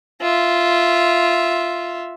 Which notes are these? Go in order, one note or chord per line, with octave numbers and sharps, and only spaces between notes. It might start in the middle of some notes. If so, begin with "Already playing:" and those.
F4 E5